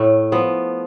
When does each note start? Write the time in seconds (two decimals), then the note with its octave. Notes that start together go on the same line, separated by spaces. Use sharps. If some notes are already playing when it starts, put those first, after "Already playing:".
Already playing: A2 A3
0.32 F3 B3